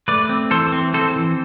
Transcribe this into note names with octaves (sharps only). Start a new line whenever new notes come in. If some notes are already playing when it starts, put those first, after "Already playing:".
A3 B4 D5
C4
E3 A4 C5
C4
C4 A4 C5
E3